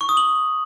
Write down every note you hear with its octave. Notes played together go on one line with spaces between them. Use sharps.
C#6
D#6
F#7